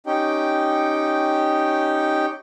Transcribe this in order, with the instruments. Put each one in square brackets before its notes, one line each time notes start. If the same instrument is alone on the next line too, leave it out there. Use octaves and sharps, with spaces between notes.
[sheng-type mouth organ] C#4 D#4 G4 G5